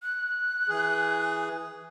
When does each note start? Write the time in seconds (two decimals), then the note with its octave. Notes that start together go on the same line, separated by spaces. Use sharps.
0.03 F#6
0.69 E3 G#4